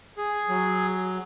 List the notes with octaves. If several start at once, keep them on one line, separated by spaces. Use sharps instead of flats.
G#4
F#3